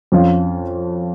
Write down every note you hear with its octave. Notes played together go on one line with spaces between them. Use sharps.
F2 F3 C#4 F4